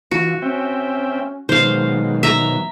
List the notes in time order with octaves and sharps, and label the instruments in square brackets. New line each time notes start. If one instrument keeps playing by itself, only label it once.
[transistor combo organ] E3 F4 [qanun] F#4
[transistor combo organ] C4 E5 G5 [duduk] C#4
[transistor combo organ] B2 D#3 F#3 [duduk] G#3 [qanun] C5 F5
[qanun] E5 A#5